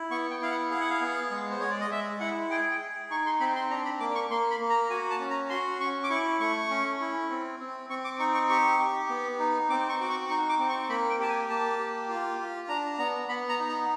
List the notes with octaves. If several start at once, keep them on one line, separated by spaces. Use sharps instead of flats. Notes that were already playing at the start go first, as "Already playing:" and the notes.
Already playing: E4
B3 C#6
G5
E4 F5
F#5
G#4 F5
F#5
F5
B3
G#3
C5
G#3 C#5
D5
D#5
G#3 E5
E4 F#5
G#4 G5
G5
G#4
D#4 C#6
C6
C4 B5
C6
D4 A#5
B5
A#3 D6
C#6
A#3 C6
B5
A#3
A#5
F#4 G#5
A5
C#4
A#5
F#4 C6
C#4 C#6
D6
E4 C#6
A3 C#6
C#4
E4
C4
C4
C4 C#6
D6
D#4 C#6
C#6
G4 C#6
G4
B3
D#4
C4 D6
C#6
F#4 D6
C#6
D#4 C#6
D6
C4
C#6
A#3 B5
G5
G4 A5
G#5
A#3 A5
G4
F4
F4
D4 A#5
B3 A#5
B3 B5
A#5
D#4
A#5